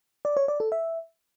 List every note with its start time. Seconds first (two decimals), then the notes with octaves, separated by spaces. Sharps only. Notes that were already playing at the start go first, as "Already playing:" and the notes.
0.25 D5
0.37 C#5
0.48 D5
0.60 A4
0.72 E5